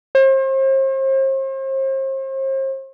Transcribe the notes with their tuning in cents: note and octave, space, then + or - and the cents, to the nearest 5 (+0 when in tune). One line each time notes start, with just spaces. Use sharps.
C5 +40